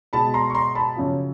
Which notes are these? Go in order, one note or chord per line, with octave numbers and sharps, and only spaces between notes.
B2 G#3 A5 B5
A#5 C6
C#6
A#5 C6
A5 B5
F#2 C#3 F3